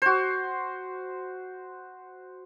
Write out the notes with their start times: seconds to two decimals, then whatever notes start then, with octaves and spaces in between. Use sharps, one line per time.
0.02 F#4 C5